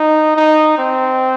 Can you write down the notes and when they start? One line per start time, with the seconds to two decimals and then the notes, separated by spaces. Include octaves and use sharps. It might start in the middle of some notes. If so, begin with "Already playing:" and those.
Already playing: D#4
0.36 D#4
0.78 C4